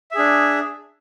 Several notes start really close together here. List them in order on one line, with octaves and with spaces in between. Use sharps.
E5 G#4 D4